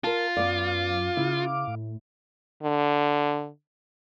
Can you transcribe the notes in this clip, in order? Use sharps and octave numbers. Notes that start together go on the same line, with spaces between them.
F4 A#4 A5
F#2 B3 D5 F5 D6
C#3 E4
A2
D3